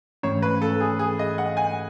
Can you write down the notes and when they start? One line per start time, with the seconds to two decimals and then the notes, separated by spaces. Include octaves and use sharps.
0.23 G#2 E3 A3 C#4 C#5
0.42 B4
0.62 A4
0.80 G#4
0.99 G#4
1.19 D#5
1.38 F#5
1.57 G#5